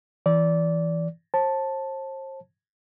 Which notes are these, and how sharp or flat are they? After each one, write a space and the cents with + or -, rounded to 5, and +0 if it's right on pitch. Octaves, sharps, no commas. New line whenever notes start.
E3 +0 D5 -15
C5 +40 A5 +0